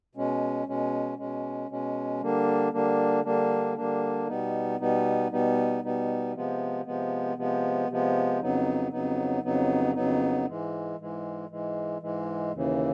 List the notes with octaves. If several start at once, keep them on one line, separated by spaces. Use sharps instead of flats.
B2 G#3 C#4
B2 G#3 C#4
B2 G#3 C#4
B2 G#3 C#4
D3 G3 A#3 D4
D3 G3 A#3 D4
D3 G3 A#3 D4
D3 G3 A#3 D4
B2 G3 B3 D#4
B2 G3 B3 D#4
B2 G3 B3 D#4
B2 G3 B3 D#4
C3 F3 G#3 B3
C3 F3 G#3 B3
C3 F3 G#3 B3
C3 F3 G#3 B3
F2 C#3 F#3 B3 D#4
F2 C#3 F#3 B3 D#4
F2 C#3 F#3 B3 D#4
F2 C#3 F#3 B3 D#4
G#2 E3 G#3
G#2 E3 G#3
G#2 E3 G#3
G#2 E3 G#3
D#2 C#3 E3